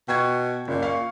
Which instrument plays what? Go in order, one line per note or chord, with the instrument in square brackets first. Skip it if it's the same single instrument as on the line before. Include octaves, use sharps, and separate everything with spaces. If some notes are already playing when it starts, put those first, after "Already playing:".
[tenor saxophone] B2 [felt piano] G5 C#6 G#6
[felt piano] F#1 [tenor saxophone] A#2
[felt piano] F5 C#6